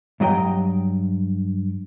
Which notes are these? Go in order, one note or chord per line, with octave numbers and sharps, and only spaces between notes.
G2 F#3 D#5 G5 A#5